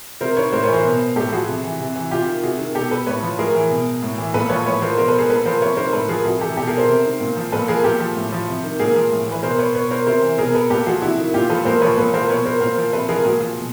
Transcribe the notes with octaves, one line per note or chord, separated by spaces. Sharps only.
C3 A#4 C5
D#3 B4 C#5
A2 A#4 C5
B4 C#5
E3
A#4 C5
B2
A2 G4 A4
F3 F#4 G#4
C3
E3
C3
E3
C3 F4 G4
D#3
C3 F#4 G#4
D#3
B2 G4 A4
A4 B4
A2 B4 C#5
F3
A2 G#4 A#4
E3
B2
A2
E3
A#2 A4 B4
F3 B4 C#5
A2 B4 C#5
F3 A#4 C5
B2 A#4 C5
A4 B4
G#4 A#4
A#2 A4 B4
F3 A#4 C5
C3 B4 C#5
D#3 A#4 C5
A2 A4 B4
F3 G#4 A#4
C3 F#4 G#4
E3 G4 A4
B2 G4 A4
G#4 A#4
A#4 C5
C3
D#3
A#2
F3
A#2 A4 B4
F3 G#4 A#4
A#2 G4 A4
F3
A2
F3
C3
D#3
A#2 G#4 A#4
F3
A2
E3 B4
B2 A#4 C5
B4 C#5
B2 B4 C#5
A#4 C5
C3 A#4 C5
E3
B2 G#4 A#4
A4 B4
A#2 G4 A4
F3 F#4 G#4
C3 E4 F#4
D#3
A#2 F4 G4
F3 A4 B4
A#2 A#4 C5
F3 B4 C#5
A#2 A4 B4
F3 A#4 C5
B2 B4 C#5
A#4 C5
A#2 A#4 C5
F3
C3 A4 B4
F3 G#4 A#4
A#2 F#4 G#4
F3
B2